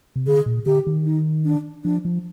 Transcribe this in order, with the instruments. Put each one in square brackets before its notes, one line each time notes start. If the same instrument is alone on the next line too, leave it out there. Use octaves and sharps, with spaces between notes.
[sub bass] C3
[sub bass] D3 [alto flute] G#4
[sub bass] A#2
[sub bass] D3 [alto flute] G4
[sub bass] D#3
[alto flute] D#4
D4
[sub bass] F3 [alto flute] D4
[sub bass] F3